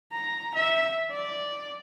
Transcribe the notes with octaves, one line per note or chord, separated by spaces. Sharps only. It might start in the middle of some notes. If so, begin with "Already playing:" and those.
A#5
E5
D5